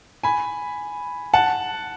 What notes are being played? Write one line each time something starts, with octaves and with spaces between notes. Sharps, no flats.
G#5 B5
F#5 A5